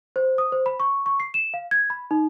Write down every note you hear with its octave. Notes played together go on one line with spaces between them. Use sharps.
C5
D#6
C5
B5
C#6
C#6
C7
E7
F5
G#6
B5
D#4